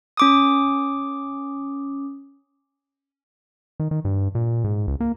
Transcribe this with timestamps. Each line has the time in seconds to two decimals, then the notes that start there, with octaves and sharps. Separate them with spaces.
0.17 C#4 D6 D#6
3.80 D#3
3.91 D#3
4.05 G2
4.35 A#2
4.64 G#2
4.87 C#2
5.00 A#3